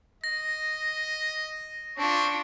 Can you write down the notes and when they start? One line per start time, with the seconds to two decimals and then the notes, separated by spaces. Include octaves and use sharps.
0.24 D#5 A#6
1.98 C4 D4 F4 C#6